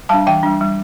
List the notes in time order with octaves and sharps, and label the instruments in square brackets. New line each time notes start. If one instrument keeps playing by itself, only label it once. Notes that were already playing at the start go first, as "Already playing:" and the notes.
[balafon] G3 D4 F5 A5
E3 E5 G5
G3 D4
G3